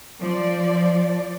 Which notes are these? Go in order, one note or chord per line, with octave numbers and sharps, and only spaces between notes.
F3 D5